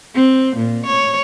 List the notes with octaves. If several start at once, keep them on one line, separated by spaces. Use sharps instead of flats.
C4
A#2
C#5